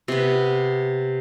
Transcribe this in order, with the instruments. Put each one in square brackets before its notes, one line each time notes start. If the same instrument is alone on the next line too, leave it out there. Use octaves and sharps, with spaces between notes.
[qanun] C3 B3